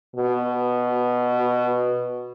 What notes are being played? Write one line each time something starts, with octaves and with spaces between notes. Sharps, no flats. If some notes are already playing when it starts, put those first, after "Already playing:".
B2